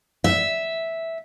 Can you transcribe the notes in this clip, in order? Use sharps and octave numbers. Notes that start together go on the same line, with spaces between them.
E5